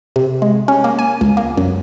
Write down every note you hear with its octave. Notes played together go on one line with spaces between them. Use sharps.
C3
G#3
C#4
A#3
G#5
C#2
A#3
F#2